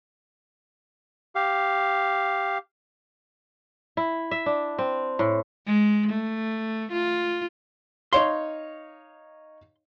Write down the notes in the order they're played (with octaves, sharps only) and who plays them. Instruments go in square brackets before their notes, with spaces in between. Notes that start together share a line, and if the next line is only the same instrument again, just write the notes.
[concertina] G4 F5
[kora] E4
E5
D4
C4
A2
[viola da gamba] G#3
A3
F4
[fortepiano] D#4 C#5 F5 [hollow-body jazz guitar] C6